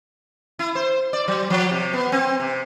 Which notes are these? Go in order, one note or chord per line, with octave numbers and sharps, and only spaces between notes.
E4
C5
D5
F#3
F3
C3
B3
C4
C3